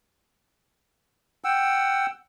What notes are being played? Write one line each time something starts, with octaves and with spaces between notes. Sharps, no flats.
F#5 G5 E6